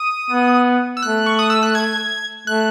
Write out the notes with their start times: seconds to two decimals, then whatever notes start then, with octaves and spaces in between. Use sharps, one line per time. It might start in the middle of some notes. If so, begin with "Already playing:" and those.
Already playing: D#6
0.30 B3
0.97 E6
1.02 A3 F#6
1.26 C#6
1.39 D#6
1.50 E6
1.63 F#6
1.75 G#6
2.47 A3 F#6